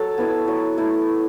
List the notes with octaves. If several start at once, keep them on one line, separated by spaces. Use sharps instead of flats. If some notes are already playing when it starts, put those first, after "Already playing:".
Already playing: F#3 A4 C#5
B3 E4
F#3
A3 E4